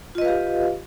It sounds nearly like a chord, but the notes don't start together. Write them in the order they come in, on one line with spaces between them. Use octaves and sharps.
F4 D#5 B4 F5 G4